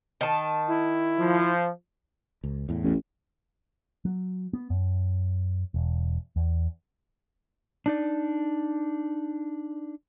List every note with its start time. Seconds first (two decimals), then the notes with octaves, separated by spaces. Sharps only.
0.21 D#3 A5
0.68 E4
1.19 F3
2.44 C#2
2.69 E2 A2
2.84 A1
4.05 F#3
4.53 B3
4.70 F#2
5.74 E1
6.36 E2
7.86 D4 D#4 D5